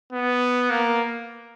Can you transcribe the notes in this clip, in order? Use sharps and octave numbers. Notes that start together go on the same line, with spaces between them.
B3
A#3